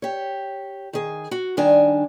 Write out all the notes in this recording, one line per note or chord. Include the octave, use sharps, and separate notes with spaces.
G4 C#5
D#3 G#4
F#4
G2 D#3 D4 G#5